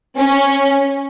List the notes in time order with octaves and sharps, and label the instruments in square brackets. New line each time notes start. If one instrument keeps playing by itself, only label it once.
[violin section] C#4